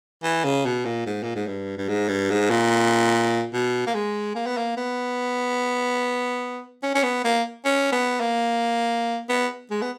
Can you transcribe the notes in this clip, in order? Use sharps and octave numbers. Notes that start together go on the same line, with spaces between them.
E3
C#3
B2
A#2
G#2
A#2
G#2
G2
G2
G#2
G2
G#2
A#2
B2
A#3
G#3
A#3
B3
A#3
B3
C#4
C#4
B3
A#3
C#4
B3
A#3
B3
G#3
B3